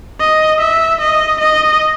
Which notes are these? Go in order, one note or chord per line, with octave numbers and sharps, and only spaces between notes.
D#5
E5
D#5
D#5